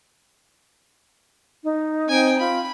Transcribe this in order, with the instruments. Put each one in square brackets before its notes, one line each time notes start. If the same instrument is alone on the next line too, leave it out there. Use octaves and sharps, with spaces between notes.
[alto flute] D#4
[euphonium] C4 [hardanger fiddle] G5 G#5
[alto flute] F4 [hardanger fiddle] B5